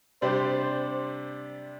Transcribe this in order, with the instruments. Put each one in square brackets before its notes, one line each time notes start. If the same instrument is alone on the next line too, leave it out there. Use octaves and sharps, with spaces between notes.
[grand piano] C3 G3 D4 G4 D5 [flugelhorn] C5